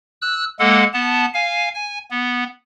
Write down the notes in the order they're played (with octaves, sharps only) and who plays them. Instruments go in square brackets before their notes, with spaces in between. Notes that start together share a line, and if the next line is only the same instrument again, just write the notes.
[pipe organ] E6 F#6
G#3 A#3 A4 F#5
B3 A5
F5 G#5
G#5
B3